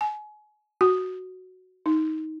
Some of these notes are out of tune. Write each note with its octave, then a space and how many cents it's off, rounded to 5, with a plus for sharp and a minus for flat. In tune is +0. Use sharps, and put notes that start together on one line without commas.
G#5 +30
F#4 +0
D#4 +15